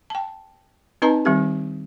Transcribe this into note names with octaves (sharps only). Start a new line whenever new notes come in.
G5 A5
C4 D#4 B4 D#5 A5 A#5
D#3 G3 C4 G4